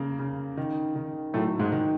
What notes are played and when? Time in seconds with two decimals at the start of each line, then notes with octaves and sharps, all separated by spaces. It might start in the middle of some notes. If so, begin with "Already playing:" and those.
Already playing: C#3 A#3
0.19 C#3
0.57 D#3
0.96 D#3
1.34 A2 F#3 A3
1.59 G#2 G#3
1.72 D#3